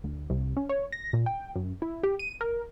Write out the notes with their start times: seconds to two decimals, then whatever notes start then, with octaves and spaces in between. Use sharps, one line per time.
0.04 D2
0.30 C2
0.57 C#4
0.69 C#5
0.92 A#6
1.13 A#2
1.26 G5
1.56 F#2
1.82 E4
2.03 G4
2.19 D#7
2.41 A#4